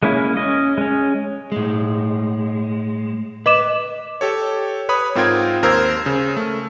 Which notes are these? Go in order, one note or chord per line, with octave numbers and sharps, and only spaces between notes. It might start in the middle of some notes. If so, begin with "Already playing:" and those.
G#3 A#3 C#4 E4
C#4 D#5
G#3 C#4
A2 G#3
B4 D#5 D6 E7
G4 A4 C#5
B4 C#5 B5 D#6
G#2 C4 F4 A#4 G5 G#6
D#2 A#4 C5 E6 F6 G#6
C#3
A3